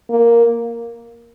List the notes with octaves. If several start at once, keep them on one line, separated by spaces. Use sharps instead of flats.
A#3